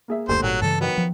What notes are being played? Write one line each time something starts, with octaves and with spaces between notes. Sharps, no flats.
A#3 G#4 E5
F#1 D2 G3 A3 A#3 C5
G#1 A#2 F#3
G2 C#3 E3 A4
D#3 F#3 B3
F3